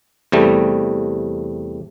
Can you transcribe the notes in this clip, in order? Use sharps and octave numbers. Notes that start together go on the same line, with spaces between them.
E2 C3 G3 A3